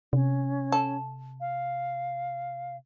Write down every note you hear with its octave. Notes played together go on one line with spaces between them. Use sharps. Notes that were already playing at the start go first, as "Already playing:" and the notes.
C3 C#4
A4
F5